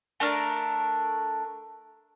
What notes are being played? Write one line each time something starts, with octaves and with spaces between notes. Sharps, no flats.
A3 D4 A#4 A5